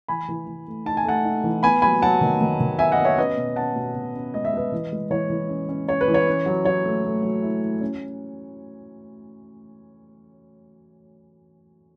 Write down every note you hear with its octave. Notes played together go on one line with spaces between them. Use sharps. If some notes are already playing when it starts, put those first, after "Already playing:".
E3 G#5 B5
E3
E3
A3
D#4 A5
G#5
A3 F#5 A5
D#4
E3
B3 G#5 B5
F#3 G#5 B5
F#3 F#5 A5
D#3
D#3
D#3
B3 E5 G#5
D#5 F#5
B3
C#5 E5
C#4 B4 D#5
B2
C#4 F#5 A5
B2
B2
C#4
G#3 D#5
E5
G#3 B4 D#5
E3
G#3
E3 C#5
E3
C#4
C#4
C#4 C#5
B4
E3
C#5
C#4
F#3
F#3 C#5
A3
A3
F#3
E4
E4
C#4